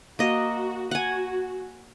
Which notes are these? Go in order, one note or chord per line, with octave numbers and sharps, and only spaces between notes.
A#3 F#4 D#5
F#4 F#5 G#5